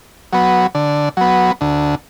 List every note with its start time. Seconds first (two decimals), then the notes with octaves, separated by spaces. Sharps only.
0.33 F#3 B3
0.75 D3
1.17 F#3 B3
1.61 D2